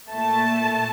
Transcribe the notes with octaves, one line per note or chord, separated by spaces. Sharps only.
A#2 A3 A5